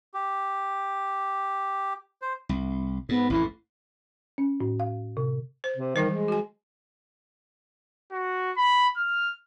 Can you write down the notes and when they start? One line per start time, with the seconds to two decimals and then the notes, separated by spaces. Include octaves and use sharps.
0.14 G4
2.22 C5
2.49 C2
3.09 G#2 B3
3.30 A1 F2 A2 E3
4.38 C#4
4.61 A2
4.80 F5
5.17 C3
5.64 C5
5.77 C3
5.96 D#3 E3 G3 C5
6.10 G#3
6.28 F#4 G#5
8.12 F#4
8.57 B5
8.97 F6